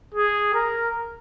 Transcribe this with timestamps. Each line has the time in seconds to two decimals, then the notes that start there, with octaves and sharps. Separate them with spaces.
0.14 G#4
0.54 A#4